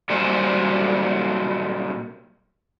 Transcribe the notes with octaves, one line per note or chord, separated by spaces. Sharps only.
A#2 F#3 G3 A#3 C5 G#5